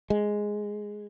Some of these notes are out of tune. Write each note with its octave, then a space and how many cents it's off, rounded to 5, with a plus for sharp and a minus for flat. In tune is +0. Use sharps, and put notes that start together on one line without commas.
G#3 +0